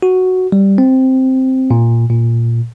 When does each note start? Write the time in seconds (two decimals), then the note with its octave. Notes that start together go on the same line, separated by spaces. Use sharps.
0.03 F#4
0.52 G3
0.78 C4
1.71 A#2
2.10 A#2